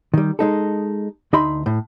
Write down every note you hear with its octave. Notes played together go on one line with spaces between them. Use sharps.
D#3 G3
G#3 D#4 A4
D2 D#4 D#5 E5 B5 C6
A2